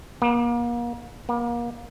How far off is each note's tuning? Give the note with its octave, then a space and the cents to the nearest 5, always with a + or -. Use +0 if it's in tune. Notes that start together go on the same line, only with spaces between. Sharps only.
A#3 +35
A#3 +30